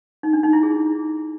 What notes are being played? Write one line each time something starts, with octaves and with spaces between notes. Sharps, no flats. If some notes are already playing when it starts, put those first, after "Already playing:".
D#4
D4
D#4
E4
G#4